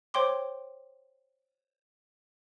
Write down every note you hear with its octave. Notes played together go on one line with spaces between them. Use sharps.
C5 C#5 G5 C6 D6